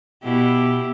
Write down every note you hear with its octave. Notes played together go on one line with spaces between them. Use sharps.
B2 E4 G4